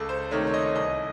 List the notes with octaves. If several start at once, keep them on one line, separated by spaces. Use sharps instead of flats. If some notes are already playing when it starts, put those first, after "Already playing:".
Already playing: C#2 A4
C5
C3 D#3 A3 C#5
C#5
D#5
C2 D#5